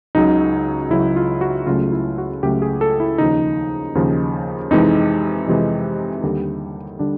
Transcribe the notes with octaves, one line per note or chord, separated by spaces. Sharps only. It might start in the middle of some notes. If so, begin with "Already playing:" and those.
C#2 C#3 F#3 D#4
C#2 C#3 F#3 E4
F4
F#4
C#2 C#3 F#3 A3 F4
E4
F#4
C#2 C#3 F#3 A3 G4
G#4
A4
E4
D#2 C#3 F3 D#4
D#2 C#3 F3
F2 C3 E3 G#3 D#4
F2 C3 E3 G#3
D#2 D3 G3
D3 G3 D4